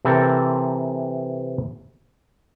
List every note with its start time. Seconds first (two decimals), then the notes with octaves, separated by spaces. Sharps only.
0.05 C3 E3 C4 A4 A#4 C5